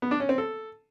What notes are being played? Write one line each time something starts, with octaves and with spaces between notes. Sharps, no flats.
B3
D4
C#4
C4
A4